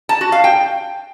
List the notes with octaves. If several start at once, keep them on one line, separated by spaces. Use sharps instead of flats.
A5
F#4
F5
G5